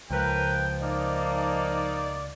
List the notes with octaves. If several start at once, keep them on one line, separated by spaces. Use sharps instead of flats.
C#2 F3 A#4 B4 G5
A#3 D#4 D5